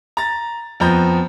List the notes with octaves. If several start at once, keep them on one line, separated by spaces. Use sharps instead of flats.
A#5 A6
F2 F3 B3 A#5 G6